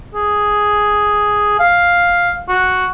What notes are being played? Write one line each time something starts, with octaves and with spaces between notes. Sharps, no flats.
G#4
F5
F#4